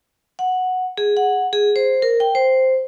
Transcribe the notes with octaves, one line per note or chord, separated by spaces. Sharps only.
F#5
G#4
F#5
G#4
C5
A#4
G5
C5